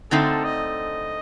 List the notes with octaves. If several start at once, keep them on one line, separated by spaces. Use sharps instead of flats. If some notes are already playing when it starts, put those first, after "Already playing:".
D3 A3 C4 D#4 A4
D#5